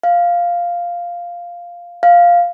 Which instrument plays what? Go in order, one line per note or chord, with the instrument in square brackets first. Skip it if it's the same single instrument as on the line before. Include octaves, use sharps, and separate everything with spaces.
[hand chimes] F5
F5